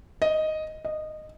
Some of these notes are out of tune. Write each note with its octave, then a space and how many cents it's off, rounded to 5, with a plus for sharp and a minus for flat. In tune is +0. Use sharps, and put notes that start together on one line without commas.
D#5 +0
D#5 -15